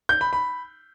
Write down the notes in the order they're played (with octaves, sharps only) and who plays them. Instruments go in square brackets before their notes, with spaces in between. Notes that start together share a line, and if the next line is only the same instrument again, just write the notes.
[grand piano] G6
B5
B5